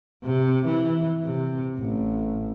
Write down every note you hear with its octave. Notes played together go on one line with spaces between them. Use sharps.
C3
E3
C3
A1